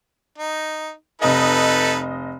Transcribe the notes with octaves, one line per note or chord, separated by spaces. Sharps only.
D#4
F1 D#4 A4 B4 D#5